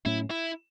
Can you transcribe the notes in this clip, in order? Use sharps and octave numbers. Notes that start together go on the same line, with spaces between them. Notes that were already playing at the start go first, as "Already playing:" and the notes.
A2 F#3 A3 C#4 E4
E4